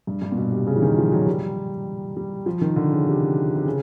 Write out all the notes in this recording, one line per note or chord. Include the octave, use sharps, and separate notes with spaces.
G2
G2
A#2
B2
C3
C#3
E3
D#3
F3
F#3
G3
G3
F3
D#3
D3
C#3
C3
C3
C#3